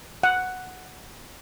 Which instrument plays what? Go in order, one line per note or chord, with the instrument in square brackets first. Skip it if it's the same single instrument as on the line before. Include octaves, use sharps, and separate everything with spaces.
[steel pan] F#5